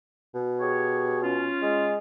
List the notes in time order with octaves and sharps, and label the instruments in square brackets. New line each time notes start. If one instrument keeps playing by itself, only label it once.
[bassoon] B2
[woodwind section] G4 G#4 C#5
C#4 F4
[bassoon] G#3